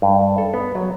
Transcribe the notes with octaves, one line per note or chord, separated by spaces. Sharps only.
G2
A4
B3
F#3